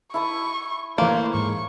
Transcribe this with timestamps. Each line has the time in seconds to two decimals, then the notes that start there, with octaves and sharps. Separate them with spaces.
0.14 E4 A5 C#6 D#6
0.98 E3 A3 A#3 C5 C#5
1.34 G#2 C#6